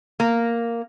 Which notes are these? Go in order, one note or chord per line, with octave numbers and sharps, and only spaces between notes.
A#3